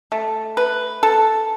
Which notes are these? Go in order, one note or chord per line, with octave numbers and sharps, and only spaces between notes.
A3
B4
A4